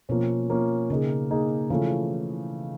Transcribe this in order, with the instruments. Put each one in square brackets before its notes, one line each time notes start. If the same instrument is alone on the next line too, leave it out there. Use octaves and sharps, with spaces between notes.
[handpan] B2 [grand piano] F3 A#3 C#4
[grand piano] F3 A#3 C#4
[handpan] C#3 [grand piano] A#3 D#4 G#4
[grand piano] A#3 D#4 G#4
[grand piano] C#3 F3 A3 [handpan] E3